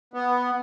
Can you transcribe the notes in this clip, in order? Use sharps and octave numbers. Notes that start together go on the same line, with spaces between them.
B3